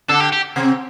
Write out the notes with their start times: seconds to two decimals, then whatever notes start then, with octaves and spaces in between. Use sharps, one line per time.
0.08 D3 D4 A4
0.20 G4
0.33 G4
0.56 C3 C4